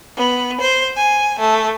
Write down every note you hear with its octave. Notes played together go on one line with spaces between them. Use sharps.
B3
C5
G#5
A3